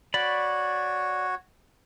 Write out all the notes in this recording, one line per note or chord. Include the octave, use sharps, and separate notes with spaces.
F#4 C#5 D5 B5